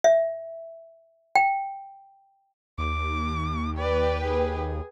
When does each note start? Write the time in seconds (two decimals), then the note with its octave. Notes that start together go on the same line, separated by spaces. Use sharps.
0.04 E5
1.35 G5
2.78 D#2 D6
3.78 G4 B4 D5
4.24 G#4